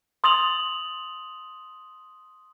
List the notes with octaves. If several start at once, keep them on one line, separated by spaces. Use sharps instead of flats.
C6 D#6 A6 F7 F#7